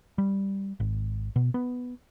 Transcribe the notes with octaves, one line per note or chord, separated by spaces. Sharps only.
G3
G#1
B2
B3